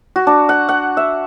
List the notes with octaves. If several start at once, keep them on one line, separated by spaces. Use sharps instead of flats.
F#4
D4
F#5
F#5
E5